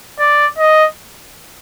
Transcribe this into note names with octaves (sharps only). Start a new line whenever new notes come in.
D5
D#5